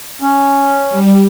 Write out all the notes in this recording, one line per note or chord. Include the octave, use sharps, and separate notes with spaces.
C#4
G3